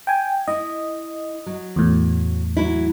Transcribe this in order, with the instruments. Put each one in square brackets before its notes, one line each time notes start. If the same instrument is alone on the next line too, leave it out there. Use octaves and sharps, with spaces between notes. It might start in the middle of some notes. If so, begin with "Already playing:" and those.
[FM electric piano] G5 G#5
[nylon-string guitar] E4 [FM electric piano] D#5
[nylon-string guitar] F#3
[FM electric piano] E2 A2
[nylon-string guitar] F#3 E4